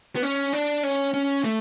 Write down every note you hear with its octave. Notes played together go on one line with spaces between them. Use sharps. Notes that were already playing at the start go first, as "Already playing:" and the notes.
B3
C#4
D4
C#4
C#4
A3